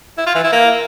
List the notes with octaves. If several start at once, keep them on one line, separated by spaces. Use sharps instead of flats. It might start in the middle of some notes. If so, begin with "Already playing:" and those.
E4
F4
E3
E4
A#3